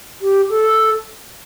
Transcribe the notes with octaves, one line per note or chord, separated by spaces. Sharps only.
G4
A4